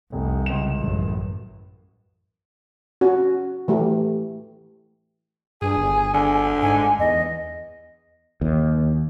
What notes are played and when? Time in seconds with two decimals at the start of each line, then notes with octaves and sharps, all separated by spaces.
0.12 F1 C2
0.46 C#2 E7
0.78 A1 F#2
3.01 C#4 F#4
3.68 E3 A3 G4
5.62 G2 G#4 G#5
5.78 G1
6.14 D3
6.62 G#2 G#5
6.99 E2 D#5
8.41 D#2